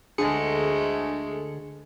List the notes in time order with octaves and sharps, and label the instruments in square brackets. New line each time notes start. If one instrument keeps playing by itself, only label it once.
[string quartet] D2 G#3 A3 [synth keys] D3 G#4 C#7